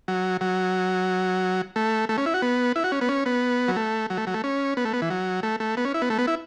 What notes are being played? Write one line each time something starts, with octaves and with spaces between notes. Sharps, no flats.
F#3
F#3
A3
A3
C#4
E4
F#4
B3
E4
F#4
C#4
B3
C#4
B3
F#3
A3
F#3
A3
F#3
A3
C#4
B3
A3
B3
E3
F#3
A3
A3
B3
C#4
E4
B3
A3
B3
E4